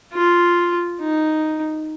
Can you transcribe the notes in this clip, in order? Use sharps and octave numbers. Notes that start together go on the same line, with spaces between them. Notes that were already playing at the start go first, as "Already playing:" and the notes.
F4
D#4